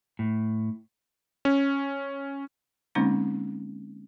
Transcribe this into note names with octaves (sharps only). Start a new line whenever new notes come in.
A2
C#4
D3 G#3 A#3 C4 C#4 D#4